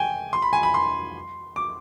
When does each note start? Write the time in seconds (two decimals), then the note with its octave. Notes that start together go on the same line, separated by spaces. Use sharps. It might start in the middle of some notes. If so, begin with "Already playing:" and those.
Already playing: G5 G#5
0.33 C6
0.42 B5
0.53 G#5
0.63 B5
0.74 C6
1.56 D6